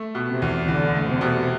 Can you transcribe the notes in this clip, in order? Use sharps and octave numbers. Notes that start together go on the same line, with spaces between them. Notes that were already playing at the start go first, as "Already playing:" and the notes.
Already playing: A3
B2
C3
E2
E2 D3
A3
C3
B2